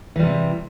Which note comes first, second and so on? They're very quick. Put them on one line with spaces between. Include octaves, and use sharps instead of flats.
E3 G3 C3